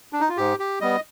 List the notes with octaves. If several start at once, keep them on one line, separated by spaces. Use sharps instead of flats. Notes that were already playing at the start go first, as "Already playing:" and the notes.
D4
D#4
F4
G#2 G4
G4
G3 B3 D#5